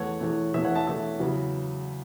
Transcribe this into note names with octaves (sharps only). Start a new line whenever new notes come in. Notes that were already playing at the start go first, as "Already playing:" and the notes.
Already playing: E2 E3 A3 C#5 F#5
E2 E3 A3
E2 E3 A3 E5
C#5 F#5
E5 A5
E2 E3 A3 E5
E2 C#3 F#3 B3